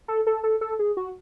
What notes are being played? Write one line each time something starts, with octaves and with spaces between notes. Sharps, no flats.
A4
A4
A4
A4
G#4
F#4